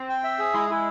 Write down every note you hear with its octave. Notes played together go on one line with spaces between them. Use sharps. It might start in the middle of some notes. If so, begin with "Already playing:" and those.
Already playing: C4
G5
E5
G#4
G#3 E4
E4